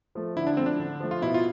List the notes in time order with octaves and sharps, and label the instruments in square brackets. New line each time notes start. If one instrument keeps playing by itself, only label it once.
[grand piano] F3 A3
[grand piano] D3 [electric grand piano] E4
[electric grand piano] D4
[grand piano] F3 A3 [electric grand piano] C4
[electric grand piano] D4
[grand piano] D3
F3 A3
[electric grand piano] F4
[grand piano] B2 [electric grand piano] E4
[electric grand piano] F4